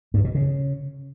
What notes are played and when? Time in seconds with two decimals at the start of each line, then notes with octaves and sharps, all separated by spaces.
0.14 G2
0.24 B2
0.35 C#3